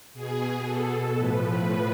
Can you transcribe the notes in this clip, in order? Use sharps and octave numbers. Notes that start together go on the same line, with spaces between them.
B2 G#4
B2 A4
A2 F3 B4